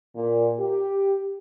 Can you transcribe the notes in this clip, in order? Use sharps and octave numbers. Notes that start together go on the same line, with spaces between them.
A#2
G4